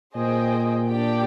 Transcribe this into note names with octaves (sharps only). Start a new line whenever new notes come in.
A#2 G#4 C5 D#5 G5
D4 G4 D5 G5